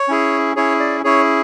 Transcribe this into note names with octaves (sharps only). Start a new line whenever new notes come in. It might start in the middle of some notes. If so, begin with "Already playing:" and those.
Already playing: C#5
C#4 E4 G#4
C#4 E4 G#4 C#5
D5
C#4 E4 G#4 C#5